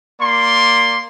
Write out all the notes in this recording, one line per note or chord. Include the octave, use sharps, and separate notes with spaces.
A#3 D5 C6